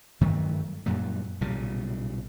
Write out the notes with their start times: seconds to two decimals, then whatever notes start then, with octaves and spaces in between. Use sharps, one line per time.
0.21 G2 D#3 F#3 A3
0.86 F#2 A#2 F#3 G3
1.41 B1 A#2 C#3 G3